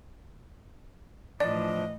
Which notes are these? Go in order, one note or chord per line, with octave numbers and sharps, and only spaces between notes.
A2 E3 F3 D4 D5 D#5